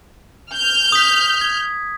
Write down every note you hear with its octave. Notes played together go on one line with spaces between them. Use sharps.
F6 G6
D#6 B6
G#6